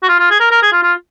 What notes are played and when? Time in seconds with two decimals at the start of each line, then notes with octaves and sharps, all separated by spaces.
0.03 F#4
0.09 F4
0.19 F4
0.30 G#4
0.40 A#4
0.51 A#4
0.62 G#4
0.72 F4
0.83 F4